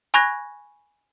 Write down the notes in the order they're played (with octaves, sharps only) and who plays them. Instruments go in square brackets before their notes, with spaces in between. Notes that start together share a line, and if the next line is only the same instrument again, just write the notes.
[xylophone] G#5 B5 C#6 F#6 G#6 A#6